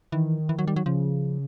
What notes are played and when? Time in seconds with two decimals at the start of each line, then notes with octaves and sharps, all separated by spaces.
0.12 D#3 E3
0.49 E3
0.59 F#3
0.68 G3
0.76 F#3
0.86 C#3 F3